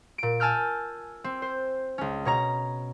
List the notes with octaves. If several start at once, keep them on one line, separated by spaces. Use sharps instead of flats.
A#2 D7
G#5 A5 E6 F6 G6
C4
C5
C#2 C#4
B2 C#5 A#5